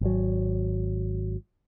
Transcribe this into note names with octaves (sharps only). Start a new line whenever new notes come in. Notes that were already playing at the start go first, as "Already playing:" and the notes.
G#1 F#3